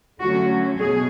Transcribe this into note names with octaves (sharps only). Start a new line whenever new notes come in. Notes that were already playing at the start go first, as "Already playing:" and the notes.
D3 F#3 A3 C#4 F#4
B2 G#4